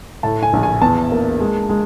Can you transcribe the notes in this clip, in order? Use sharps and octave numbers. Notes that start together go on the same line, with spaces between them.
A2 A5
G#5
A#1
G#5
E2 A5
A#3
G#3
G#3